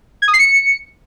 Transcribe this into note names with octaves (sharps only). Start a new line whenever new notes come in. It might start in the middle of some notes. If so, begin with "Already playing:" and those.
G#6
D#6
C7
C#7